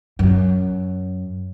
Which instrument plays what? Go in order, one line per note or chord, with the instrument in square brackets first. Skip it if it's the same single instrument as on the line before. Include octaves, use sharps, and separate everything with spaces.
[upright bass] F#2